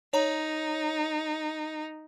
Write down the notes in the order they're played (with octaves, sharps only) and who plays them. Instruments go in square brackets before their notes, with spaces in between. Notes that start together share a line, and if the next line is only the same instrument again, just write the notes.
[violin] D#4 [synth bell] C#5 A#5